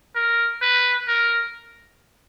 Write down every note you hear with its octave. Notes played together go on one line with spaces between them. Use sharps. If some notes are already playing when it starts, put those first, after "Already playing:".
A#4
B4
A#4